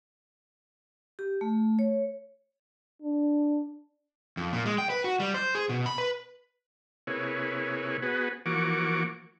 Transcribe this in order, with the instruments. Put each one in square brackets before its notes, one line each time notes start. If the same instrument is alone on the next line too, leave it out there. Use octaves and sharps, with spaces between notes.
[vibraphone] G4
A3
C#5
[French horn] D4
[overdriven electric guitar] F2
A#2
G#3
G5
B4
F#4
G3
C5
G#4
B2
B5
B4
[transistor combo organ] C3 A#3 E4 G#4 B4 C#5
B3 F#4 G#4 B4
E3 F3 A#3 F#4 C#6 D6